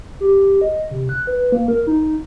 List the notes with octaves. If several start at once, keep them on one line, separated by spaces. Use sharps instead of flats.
G4
D#5
C3
F#6
B4
A#3
A#4
D#4